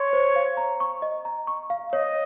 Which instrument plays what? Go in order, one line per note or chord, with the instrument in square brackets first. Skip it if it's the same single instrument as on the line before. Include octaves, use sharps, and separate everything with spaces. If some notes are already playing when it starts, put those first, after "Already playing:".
Already playing: [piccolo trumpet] C#5 [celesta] C6
[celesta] C5
F5
A#5
C#6
D#5
A#5
C#6
F5
[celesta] C#5 [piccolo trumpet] D#5